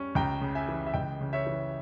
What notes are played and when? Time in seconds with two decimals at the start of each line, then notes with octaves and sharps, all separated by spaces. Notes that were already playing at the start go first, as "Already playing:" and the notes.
Already playing: G3 C#4
0.15 C#2 G5 A#5
0.41 C#3
0.55 E5 G#5
0.68 E3
0.86 E5
0.94 C#2 D#5 G5
1.21 C#3
1.33 C#5 E5
1.47 E3